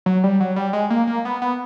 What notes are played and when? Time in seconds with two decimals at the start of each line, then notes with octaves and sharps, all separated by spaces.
0.06 F#3
0.24 G3
0.40 F#3
0.56 G3
0.73 G#3
0.90 A#3
1.07 A#3
1.25 B3
1.42 B3